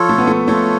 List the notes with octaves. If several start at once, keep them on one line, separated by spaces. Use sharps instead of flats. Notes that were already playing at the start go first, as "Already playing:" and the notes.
Already playing: F3 F4 A4 C#5
A3
B3
A3
A3 F4 A4 C#5